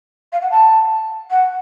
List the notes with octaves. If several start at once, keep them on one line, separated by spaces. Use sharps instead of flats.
F5
F#5
A5
F#5